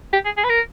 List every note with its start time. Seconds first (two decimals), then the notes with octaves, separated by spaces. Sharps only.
0.13 G4
0.25 G#4
0.37 G#4
0.44 B4
0.49 A#4